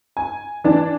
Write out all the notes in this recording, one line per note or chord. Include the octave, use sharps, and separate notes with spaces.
G#5
E3 D4 A5